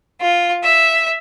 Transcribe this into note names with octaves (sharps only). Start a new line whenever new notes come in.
F4
E5